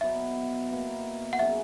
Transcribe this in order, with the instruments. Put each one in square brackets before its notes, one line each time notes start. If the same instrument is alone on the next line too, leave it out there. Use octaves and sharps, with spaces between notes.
[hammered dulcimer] B2 F#3 B3 E4 [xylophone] E5
[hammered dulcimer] B2 A#3 E4
[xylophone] F#5
[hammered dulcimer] F#3 C#4 G#4 [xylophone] E5